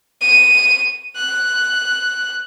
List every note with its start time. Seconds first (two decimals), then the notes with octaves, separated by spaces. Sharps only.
0.21 D#7
1.16 F#6